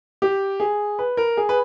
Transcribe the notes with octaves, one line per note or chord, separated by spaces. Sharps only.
G4
G#4
B4
A#4
G#4
B4